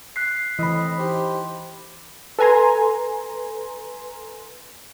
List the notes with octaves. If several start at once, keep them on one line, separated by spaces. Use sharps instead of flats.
F#6 B6 C7
A2 E3 C4 D#5 B5
D#4 G4 C5
A4 B4 G#5 A#5 C6